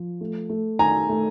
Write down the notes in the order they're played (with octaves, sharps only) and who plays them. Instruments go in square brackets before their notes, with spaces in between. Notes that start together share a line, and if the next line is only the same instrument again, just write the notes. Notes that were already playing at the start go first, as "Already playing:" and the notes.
Already playing: [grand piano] F3
A3
A3
[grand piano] D#3 [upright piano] G#5 A#5
[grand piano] A3